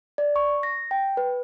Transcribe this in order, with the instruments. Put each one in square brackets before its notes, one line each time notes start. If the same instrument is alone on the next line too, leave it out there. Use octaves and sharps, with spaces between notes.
[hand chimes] D5
C#6
A#6
G5
B4